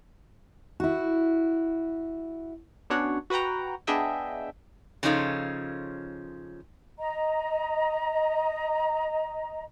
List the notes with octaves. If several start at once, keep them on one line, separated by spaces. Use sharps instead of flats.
E4 F#4
B3 C#4 D4 F#4 C#5 F#5
F#4 B4 F#5 G5 A#5
B3 D4 G#4 D#5 E5 G5
C#3 F3 C#4 D#4 F4 A4
D#5 A#5